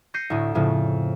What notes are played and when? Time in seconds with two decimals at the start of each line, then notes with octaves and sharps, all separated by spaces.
0.14 G6 A#6 C7 C#7 D#7
0.30 D2 A2
0.55 F2 A2 C#3